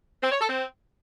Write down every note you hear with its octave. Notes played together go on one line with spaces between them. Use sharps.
C4
C#5
A4
C4